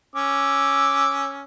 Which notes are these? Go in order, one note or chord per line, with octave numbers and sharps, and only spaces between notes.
C#4 D6 E6